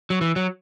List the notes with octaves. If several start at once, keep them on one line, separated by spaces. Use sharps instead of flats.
F#3
E3
F#3